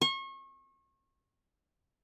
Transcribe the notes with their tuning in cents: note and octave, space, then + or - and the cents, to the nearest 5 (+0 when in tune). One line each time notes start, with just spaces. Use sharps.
C#6 -35